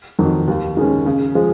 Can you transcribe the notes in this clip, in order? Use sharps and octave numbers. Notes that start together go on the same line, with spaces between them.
F2 D#3 F#3
D#2
D#3 G#3 C#4
C#3
F3 G#3